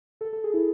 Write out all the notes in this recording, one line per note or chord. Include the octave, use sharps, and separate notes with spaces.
A4
A4
G#4
E4